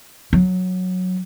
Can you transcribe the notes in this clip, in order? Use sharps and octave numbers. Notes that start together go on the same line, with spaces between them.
F#3